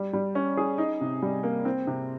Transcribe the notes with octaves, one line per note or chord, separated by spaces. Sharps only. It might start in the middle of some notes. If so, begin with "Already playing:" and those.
Already playing: G3
G3
C#4
G#4
D#4
C3
G3
A#3
C4
C3